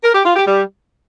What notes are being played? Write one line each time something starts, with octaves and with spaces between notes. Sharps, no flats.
A#4
G4
F4
G4
G3